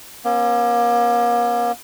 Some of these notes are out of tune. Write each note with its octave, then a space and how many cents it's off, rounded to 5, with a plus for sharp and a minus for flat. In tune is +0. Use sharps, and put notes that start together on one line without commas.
A#3 +40 C#4 -30